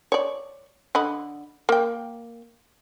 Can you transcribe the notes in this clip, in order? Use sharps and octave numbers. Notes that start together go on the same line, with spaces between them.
C#5 D5
D3 D#5 B5
A#3 G5